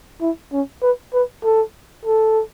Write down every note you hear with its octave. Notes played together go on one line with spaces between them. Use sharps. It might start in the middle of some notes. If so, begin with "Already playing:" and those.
E4
C#4
B4
B4
A4
A4